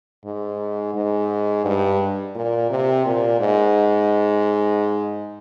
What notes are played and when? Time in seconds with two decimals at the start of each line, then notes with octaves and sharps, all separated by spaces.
0.25 G#2
0.95 G#2
1.65 G2
2.35 A#2
2.70 C3
3.06 A#2
3.40 G#2